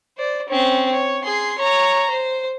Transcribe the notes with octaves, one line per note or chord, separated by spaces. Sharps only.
C5 D5
C4 C#4
C#5
G#4 C6
C#5 A#5
C5